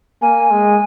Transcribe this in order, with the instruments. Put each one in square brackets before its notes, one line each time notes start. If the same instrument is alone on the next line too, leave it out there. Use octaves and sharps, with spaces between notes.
[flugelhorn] A#3 [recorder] G#5
[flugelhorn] G#3